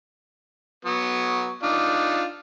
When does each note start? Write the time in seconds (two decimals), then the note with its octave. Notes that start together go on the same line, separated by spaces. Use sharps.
0.85 F#3 B3
1.63 D4 D#4 F4